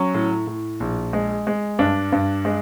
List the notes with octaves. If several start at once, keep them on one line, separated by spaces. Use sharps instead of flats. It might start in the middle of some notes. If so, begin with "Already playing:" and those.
Already playing: F#3 C#4
A2
A2
A#1
G#3
G#3
G2 D4
G2
G#3